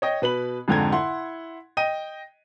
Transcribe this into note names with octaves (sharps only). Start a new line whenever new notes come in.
C#5 D#5 G5
B2 B4 B5 F#7
F2 G#2 D3 G5 A#5 G#6
E4 F#5 C6
D#5 G5 D#7